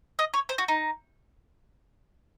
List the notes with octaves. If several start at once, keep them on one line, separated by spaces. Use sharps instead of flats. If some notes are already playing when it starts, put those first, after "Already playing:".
D#5
C#5
C5
F#4
D#4